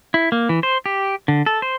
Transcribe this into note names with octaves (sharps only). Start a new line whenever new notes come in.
E4
A#3
E3
C5
G4
D3
A4
C5